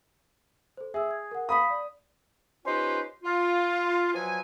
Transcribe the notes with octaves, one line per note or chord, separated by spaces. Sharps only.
A4 C5
G#4 E5 E6
G#6
A#4 F#5
F5 B5 D#6 B6
D5
C#4 D#4 F4 G4 B4 C5
F4
B2 F3 F#3 G#5